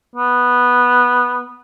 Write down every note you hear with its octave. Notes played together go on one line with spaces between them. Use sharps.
B3